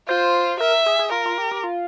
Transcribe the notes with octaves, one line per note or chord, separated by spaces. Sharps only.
F4 C5
A#4 E5
G#4
G#4
F4 A#4
F4
G4
G4
F4